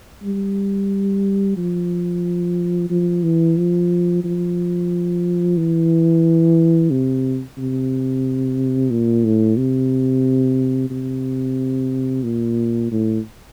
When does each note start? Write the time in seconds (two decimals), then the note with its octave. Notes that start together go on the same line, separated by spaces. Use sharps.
0.24 G3
1.57 F3
2.90 F3
3.23 E3
3.58 F3
4.24 F3
5.58 E3
6.91 C3
7.58 C3
8.90 A#2
9.25 A2
9.58 C3
10.91 C3
12.24 A#2
12.91 A2